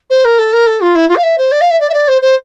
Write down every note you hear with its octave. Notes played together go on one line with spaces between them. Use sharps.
C5
A#4
A4
A#4
A4
F4
E4
F4
F5
E5
C5
D5
F5
E5
D5
E5
D5
C5
C5